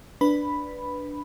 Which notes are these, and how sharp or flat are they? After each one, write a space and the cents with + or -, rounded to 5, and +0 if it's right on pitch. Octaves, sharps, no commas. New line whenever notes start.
D4 +0 B4 +0 B5 +0